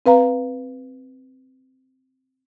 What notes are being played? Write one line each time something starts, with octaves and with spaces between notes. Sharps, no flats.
C4 B4 F5 A#5